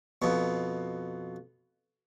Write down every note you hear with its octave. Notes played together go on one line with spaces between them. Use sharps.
F2 B2